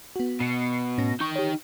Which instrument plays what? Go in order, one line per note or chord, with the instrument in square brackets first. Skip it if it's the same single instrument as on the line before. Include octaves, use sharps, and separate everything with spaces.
[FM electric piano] B3 F#4
[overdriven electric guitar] B2 [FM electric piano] C7 C#7
[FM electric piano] A2 C#4 A#6
[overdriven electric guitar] D#4 G5 [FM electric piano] C#6 G6
[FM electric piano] G4 C#5